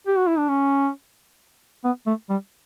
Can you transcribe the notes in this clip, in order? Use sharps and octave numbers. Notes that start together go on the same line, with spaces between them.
G4
F#4
E4
D4
C#4
B3
A3
G3